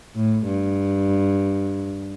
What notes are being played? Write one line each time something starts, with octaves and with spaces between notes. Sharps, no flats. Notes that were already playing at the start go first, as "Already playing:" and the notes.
A2
G2